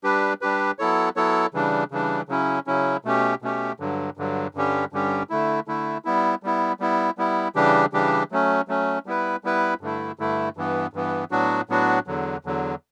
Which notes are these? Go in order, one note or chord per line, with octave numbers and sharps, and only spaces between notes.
G3 D4 G4 B4
G3 D4 G4 B4
F#3 B3 E4 A4 C#5
F#3 B3 E4 A4 C#5
C#3 E3 G3 D4
C#3 E3 G3 D4
C#3 F#3 C#4 E4
C#3 F#3 C#4 E4
B2 A3 C#4 G4
B2 A3 C#4 G4
G2 D3 F#3
G2 D3 F#3
G2 D3 G3 C#4 G4
G2 D3 G3 C#4 G4
D3 A3 E4
D3 A3 E4
G3 B3 E4
G3 B3 E4
G3 B3 E4
G3 B3 E4
C#3 E3 G3 D4 G4
C#3 E3 G3 D4 G4
F#3 A3 C#4
F#3 A3 C#4
G3 B3 E4 B4
G3 B3 E4 B4
G2 D3 A3 E4
G2 D3 A3 E4
G2 E3 B3
G2 E3 B3
A2 F#3 B3 D4 F#4
A2 F#3 B3 D4 F#4
E2 D3 F#3
E2 D3 F#3